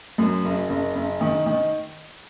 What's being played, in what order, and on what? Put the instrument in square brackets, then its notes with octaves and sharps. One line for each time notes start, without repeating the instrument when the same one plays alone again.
[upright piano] F#2
F#1
F#1
F#1
D#3
D#3